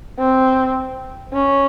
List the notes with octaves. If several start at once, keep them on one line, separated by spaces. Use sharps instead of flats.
C4
C#4